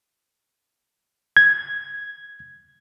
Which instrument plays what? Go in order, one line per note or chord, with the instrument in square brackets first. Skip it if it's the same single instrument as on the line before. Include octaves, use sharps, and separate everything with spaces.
[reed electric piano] G#6